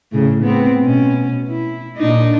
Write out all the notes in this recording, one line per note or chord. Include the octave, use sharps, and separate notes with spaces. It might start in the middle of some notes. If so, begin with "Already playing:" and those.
A2 C#3
B3 C4
B2 C#4
E4
A#2 D4 D#4